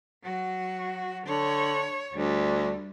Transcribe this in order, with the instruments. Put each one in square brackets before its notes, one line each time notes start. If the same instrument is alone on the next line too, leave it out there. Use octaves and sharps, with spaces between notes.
[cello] F#3 F#4
[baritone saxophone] D3 [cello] C#5
[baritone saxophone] D2 [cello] G3